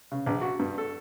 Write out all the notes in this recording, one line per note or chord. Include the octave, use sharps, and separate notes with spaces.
C#3
A#1
F#4
G2
A4